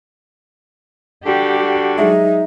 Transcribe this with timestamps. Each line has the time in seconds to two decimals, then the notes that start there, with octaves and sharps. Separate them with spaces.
1.25 D3 G3 F#4 G4
1.98 F#3 G#3 D#4 E5